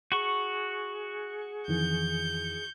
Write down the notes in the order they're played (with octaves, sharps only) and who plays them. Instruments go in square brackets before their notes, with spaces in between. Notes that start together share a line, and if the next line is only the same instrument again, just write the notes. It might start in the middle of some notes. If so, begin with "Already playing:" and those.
[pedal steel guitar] F#4 C#6 [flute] G#4
[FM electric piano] F2 D#3 E3 [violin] G6